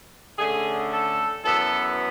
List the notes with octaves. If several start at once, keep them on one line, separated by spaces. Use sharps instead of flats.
D3 A3 C#4 G#4
A4
F#2 E3 B3 A4